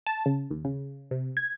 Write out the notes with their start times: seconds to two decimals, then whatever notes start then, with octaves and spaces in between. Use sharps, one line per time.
0.06 A5
0.26 C#3
0.50 D#2
0.65 C#3
1.11 C3
1.37 G#6